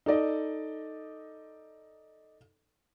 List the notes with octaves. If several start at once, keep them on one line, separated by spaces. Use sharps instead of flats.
D#4 A4 D5 D#5